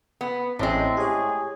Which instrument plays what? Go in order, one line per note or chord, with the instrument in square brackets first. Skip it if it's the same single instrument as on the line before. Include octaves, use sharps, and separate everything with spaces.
[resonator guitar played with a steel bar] B3
[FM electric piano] A1 C#4 [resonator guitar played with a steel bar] A2 G#3 [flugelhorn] C4
[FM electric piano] G4 C#5 [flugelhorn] G#4